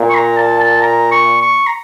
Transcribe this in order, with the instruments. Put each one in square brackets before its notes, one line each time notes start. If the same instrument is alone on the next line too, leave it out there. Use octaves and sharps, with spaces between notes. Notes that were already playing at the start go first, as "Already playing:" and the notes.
Already playing: [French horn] A#2
[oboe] C#6
A#5
A5
A5
A#5
C#6
C#6
A#5